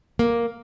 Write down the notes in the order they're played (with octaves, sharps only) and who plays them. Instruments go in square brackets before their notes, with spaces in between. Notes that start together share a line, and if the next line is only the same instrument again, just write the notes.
[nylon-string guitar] A#3